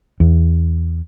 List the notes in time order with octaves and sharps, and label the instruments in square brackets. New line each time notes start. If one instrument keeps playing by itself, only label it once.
[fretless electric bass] E2